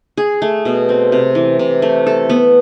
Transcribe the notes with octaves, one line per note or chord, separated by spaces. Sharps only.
G#4
A3
B2
C4
C3
E3
C3
A3
A4
B3